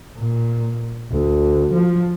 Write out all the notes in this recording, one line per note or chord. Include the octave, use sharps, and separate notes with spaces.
A#2
D2
F3